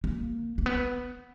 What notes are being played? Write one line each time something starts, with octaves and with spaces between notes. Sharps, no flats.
A#3
A#3
B3